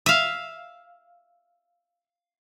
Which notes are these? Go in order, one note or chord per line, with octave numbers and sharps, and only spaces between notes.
E5 F5